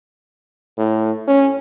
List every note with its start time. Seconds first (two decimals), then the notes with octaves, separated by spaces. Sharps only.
0.78 A2
1.28 C#4